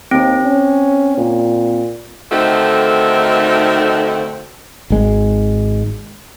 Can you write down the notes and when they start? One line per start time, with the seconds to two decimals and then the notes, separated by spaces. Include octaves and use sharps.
0.11 D#2 C4
0.44 C#4
1.18 A#2
2.32 D3 D#3 A3 C4 D#4 F#4
4.90 G#1 G#3